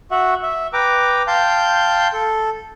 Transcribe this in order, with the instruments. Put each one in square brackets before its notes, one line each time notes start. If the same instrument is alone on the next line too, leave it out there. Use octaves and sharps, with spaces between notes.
[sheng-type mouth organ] F#4 E5 F#5
E5
B4 G5 A#5 D6
F5 G5 A5 C6 G6
A4